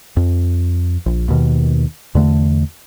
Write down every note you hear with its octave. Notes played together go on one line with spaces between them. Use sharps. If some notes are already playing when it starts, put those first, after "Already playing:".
F2
A#1
D#2 B2 D#3
E2 D3 A3